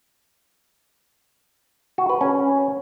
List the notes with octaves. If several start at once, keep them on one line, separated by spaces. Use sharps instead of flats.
F#4
B4
C#4